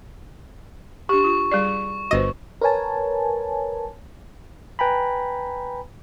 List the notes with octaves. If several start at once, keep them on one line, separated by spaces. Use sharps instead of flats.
D4 G4 C#6
F4
G3 G#4 D5
G1 F#4 B4 C5 D#5
A#4 B4 C#5 G#5 A5
B4 G5 G#5 A#5 B5